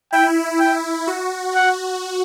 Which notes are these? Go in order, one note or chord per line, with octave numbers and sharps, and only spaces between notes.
E4 G5
E4 G5
F#4
F#5